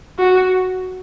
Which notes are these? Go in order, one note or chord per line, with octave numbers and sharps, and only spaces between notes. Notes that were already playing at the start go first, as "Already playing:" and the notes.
F#4